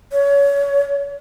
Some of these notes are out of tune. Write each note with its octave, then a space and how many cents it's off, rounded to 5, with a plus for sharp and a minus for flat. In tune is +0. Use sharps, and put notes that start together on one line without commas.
C#5 +25